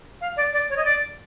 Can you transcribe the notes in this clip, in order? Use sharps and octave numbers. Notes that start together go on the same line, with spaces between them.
F5
D5
D5
C#5
D#5
D5